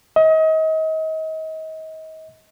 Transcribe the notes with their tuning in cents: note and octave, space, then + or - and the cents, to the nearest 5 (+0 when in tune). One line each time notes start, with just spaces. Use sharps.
D#5 +35